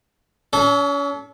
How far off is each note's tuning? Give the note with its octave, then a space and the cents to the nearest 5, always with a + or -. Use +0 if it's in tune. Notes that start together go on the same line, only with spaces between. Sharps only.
C#4 +35 A4 -25